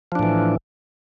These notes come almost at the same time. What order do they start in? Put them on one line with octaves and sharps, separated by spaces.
F3 D4 A2 E3